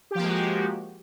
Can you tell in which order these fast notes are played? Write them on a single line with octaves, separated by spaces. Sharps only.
G4 F3 A#3 G#3 F#4